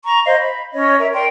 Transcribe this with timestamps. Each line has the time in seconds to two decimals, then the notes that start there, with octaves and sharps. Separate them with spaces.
0.05 A#5 C#6
0.25 C5 D#5 F5
0.39 B5
0.72 C#4 C#5 D#5
0.99 A#4 E5
1.12 A#4 D5 G5 C6